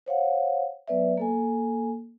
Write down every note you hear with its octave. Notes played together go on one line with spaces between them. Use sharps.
C5 C#5 F5 F#5
F#3 B3 B4 D5 E5
A#3 A4 G#5